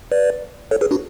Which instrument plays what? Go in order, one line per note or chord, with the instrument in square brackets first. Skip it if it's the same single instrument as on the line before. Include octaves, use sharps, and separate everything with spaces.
[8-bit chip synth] B4 D5
A4 C#5
G#4 B4
D4 F#4